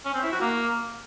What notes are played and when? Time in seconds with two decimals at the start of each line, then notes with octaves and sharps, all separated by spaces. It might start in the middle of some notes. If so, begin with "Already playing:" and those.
0.05 C#4
0.14 C4
0.23 E4
0.32 F#4
0.41 A#3